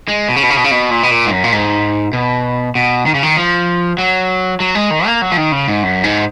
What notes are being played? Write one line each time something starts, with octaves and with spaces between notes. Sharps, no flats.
G#3
B2
C#3
B2
C#3
B2
C#3
B2
A#2
B2
A#2
G#2
F#2
A#2
G#2
B2
B2
D#3
C#3
D#3
F3
F#3
F#3
G#3
D#3
A#3
F#3
F3
D#3
C#3
G#2
F#2
G#2